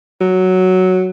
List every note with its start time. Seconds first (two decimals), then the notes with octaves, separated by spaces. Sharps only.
0.21 F#3